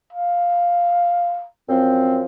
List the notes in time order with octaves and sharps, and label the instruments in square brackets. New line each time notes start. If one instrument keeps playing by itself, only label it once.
[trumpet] F5
[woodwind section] F#2 F3 C4